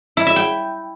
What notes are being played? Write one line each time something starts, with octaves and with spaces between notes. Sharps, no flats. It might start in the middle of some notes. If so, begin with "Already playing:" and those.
E4
E5
G5